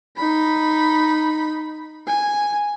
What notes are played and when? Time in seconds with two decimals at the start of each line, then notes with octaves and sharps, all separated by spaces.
0.17 D#4 B5
2.07 G#5